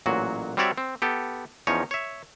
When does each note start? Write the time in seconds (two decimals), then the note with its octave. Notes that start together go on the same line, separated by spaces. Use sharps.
0.06 A1 A#2 F#3 F#4
0.57 G3 C4 F#4 C#5 D5 E5
0.78 C4
1.02 B3 G4 A4
1.67 E2 F3 C#4 D#4 C#5
1.91 C#5 E5